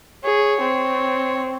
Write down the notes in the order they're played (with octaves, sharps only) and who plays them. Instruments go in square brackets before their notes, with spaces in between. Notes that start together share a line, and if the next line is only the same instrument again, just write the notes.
[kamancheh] G#4 [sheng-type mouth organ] C#5
[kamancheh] C4